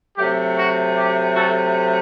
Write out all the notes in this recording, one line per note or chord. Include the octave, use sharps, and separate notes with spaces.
C3 F#3 A3 G4
F#4
G4
F#4 A4